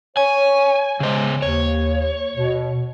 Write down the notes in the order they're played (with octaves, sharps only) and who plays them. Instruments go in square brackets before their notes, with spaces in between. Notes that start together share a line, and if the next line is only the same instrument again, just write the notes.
[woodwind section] C#5 [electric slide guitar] G#5
[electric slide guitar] C#3 C5 [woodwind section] G#3
[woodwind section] D#2 [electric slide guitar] C#5
[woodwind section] B2